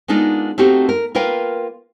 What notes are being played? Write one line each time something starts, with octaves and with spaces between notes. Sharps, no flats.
G#3 A#3 B3 D4 D#4 F4
A3 A#3 C4 D#4 F#4 G4
A#4
A#3 F4 A#4 B4 F5 G5